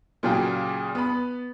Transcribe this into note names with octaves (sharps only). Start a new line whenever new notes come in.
A#2 C#3 F#3 F4 G4 G#4
B3 B5